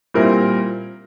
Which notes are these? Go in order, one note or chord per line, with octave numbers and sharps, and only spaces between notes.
A#2 G3 C4 E4 A#4